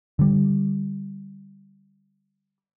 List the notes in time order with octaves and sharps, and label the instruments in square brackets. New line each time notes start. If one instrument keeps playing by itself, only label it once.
[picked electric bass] D3 G3